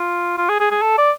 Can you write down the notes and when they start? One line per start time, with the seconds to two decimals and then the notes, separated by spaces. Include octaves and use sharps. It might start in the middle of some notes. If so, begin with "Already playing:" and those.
Already playing: F4
0.38 F4
0.49 G#4
0.60 G#4
0.71 G#4
0.82 A4
0.98 D5